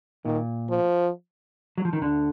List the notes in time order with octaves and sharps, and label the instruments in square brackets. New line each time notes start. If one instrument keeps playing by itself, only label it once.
[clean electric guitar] A#2 [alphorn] D#3
[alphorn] F3
[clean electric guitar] F#3
F3
D#3
D2 D3